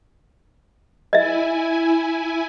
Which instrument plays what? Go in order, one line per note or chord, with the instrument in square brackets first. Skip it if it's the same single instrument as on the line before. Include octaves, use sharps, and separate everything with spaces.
[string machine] E4 G#5 [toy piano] D#5 E5